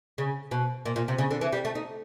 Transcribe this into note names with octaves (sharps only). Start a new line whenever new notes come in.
C#3
B2
A#2
A#2
C3
C#3
D3
E3
G3
A3
D#4